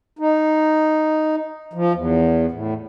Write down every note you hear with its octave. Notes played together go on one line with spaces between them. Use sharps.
D#4
F3
E2
A2